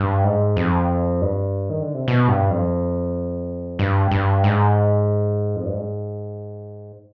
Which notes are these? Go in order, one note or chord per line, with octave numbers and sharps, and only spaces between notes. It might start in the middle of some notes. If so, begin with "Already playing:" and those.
Already playing: G2
G#2
F2
G2
D#3
D3
C3
B2
G2
F2
G2
G2
G#2
F2
G2
G#2